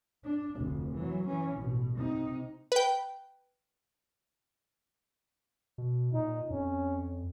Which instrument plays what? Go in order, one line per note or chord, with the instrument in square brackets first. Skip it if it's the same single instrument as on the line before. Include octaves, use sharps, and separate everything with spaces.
[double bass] D4
F1 D2
E3 F#3
E3 C#4
A1 B2
C3 D#4
[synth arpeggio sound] B4 G5
[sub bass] B2
[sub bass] A#2 [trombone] D#4
[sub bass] F2 [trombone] C#4